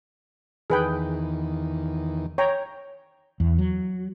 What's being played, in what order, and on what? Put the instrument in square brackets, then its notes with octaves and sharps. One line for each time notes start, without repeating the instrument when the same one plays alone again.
[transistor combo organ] E2 D#3 [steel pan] G#4 B4 G5
[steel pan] C#5 G5 A#5
[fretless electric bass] E2
F#3